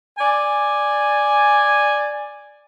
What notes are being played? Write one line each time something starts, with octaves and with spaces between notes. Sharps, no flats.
D5 G#5